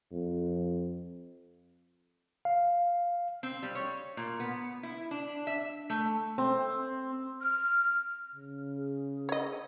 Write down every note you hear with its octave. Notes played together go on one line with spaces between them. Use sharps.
F2
F5
C4
G3
C#5
A#2
B3
E4
D4
E5
A3
C4
F6
C#3
G#4
C#5 D#5